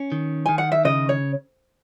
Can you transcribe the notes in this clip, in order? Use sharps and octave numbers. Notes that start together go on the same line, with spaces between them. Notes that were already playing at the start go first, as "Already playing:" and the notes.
Already playing: C#4
D#3
D#3 G#5
F#5
E5
C#3 D#5
C#5